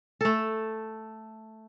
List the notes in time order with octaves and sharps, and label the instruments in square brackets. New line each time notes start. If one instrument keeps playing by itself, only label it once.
[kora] A3 A4